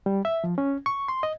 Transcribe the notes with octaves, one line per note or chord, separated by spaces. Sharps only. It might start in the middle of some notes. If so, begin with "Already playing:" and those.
G3
E5
F3
C#4
C#6
C6
D#5